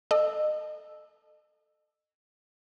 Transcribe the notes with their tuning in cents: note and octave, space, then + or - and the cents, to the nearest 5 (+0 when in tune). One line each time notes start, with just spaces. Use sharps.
A4 +0 D#5 -25 E6 +0